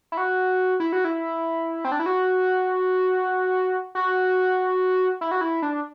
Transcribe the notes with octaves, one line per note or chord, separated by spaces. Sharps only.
E4
F#4
E4
F#4
E4
C4
D4
E4
F#4
F#4
E4
F#4
E4
D4